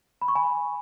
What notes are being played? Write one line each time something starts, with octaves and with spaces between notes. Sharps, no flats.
B5
C#6
G#5 B5